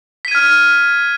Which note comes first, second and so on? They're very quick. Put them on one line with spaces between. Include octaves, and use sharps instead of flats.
B6 D#7 G#6 F6